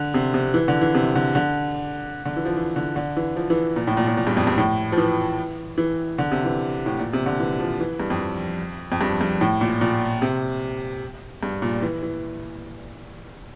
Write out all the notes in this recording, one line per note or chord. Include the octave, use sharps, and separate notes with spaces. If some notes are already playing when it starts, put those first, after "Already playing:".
Already playing: D3
C3
C3
E3
D3
E3
C3
D3
D3
D3
E3
F3
E3
D3
D3
E3
F3
E3
A#2
A2
A#2
A2
A#2
G2
F2
G2
A2
F3
E3
E3
D3
C3
E3
A2
A#2
C3
D3
E3
F3
E3
G2
F2
F2
G2
G2
A2
A#2
A#2
C3
G2
A#2
E3
E3